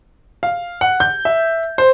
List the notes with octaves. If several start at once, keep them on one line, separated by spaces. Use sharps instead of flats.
F5
F#5
G6
E5
C5